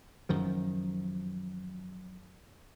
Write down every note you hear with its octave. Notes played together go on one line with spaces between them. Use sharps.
F#2 D#3 F3